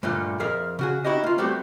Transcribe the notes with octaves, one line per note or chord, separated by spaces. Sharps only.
G2 A#2 D3 A3
F2 G#4 A#4 E5 F5
C#3 F#4 G#4
D#4 E4 F#4 G4 D#5
A#3 F4
G3 A3 B3 C4 F#4 G4